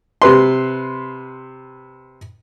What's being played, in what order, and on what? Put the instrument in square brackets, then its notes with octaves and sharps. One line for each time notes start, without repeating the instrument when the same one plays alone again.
[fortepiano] C3 B4 C6